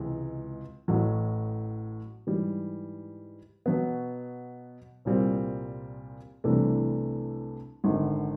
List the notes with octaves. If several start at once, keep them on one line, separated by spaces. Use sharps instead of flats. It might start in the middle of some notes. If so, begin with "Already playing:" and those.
Already playing: C#2 C3 E3 G#3
A1 A2 F#3
G#2 E3 G3
B2 F#3 B3
C2 A#2 G3 C4
C2 C3 E3 A3 D4
G#1 F#2 D3